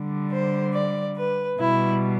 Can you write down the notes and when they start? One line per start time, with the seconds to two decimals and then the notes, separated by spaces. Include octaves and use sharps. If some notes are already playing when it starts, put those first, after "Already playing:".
Already playing: D3 G3
0.31 C5
0.74 D5
1.17 B4
1.59 B2 G3 E4